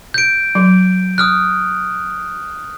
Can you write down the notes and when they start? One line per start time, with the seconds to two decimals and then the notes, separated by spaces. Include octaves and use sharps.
0.14 G6 D7
0.55 F#3
1.18 D#6 F6 F#6